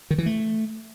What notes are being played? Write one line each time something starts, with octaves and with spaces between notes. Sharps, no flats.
D#3
E3
A3